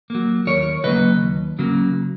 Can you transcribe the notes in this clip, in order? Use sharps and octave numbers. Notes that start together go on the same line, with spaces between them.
F#3 A#3
D#2 A#4 C#5
C#3 F#3 A#3 B4 D#5
D#2
C#3 F#3 A#3